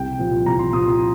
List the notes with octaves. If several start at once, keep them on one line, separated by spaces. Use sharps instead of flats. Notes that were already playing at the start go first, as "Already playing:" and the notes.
Already playing: C2 G5
A#2 F3
C2 A#5
C6
A#2 F3 D#6
C6